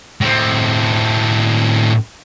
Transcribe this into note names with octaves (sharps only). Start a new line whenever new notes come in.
A2 C4